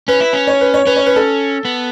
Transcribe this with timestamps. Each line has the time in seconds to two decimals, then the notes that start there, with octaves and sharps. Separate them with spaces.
0.08 C#4 B4
0.21 E4
0.33 C#4
0.47 C#5
0.61 B4
0.74 C#5
0.87 C#4 B4
0.96 C#5
1.06 B4
1.16 A4
1.65 B3